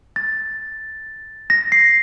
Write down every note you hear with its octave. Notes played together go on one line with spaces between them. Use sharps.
A6
A#6
C7